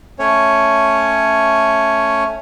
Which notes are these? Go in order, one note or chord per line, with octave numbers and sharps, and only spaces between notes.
A3 C#4 C#5